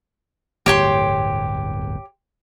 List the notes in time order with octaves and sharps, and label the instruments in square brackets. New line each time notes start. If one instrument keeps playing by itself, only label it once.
[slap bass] D1 G1 E2 [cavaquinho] G4 C#5 C6